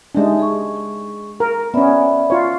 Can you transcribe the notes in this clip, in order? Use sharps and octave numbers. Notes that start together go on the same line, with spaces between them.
G#3 D4 D#4 G4 E5
G#4 C#6
A#4
B3 C#4 D5 E5 B5
F4 C#5